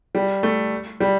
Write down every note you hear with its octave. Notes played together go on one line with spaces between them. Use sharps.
G3
A3
G3